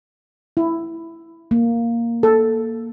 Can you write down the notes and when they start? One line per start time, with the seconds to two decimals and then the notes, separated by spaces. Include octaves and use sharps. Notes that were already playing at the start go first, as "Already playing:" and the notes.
0.57 E4
1.51 A#3
2.23 A4